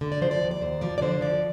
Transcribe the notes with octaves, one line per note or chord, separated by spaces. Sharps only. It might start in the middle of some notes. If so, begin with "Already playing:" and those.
D3
D5
F3 C5
D5
D#2
D5
D#2 C5
F3 D5
D5
D3 C5
F3 D5